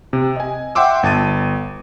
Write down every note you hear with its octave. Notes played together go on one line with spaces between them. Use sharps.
C3
D#5 G#5
E5 F#5 G5 C6 D6 E6
G1 A5 A6 D#7